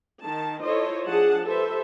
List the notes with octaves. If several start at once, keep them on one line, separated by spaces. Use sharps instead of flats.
D#3 A5
E4 F4 A4 C5 C#5 D#5
F3 D4 G#4 F#5 A5
G4 A4 B4 C5 E5